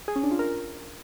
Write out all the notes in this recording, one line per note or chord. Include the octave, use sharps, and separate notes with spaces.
G#4
C#4
D4
F4
A#4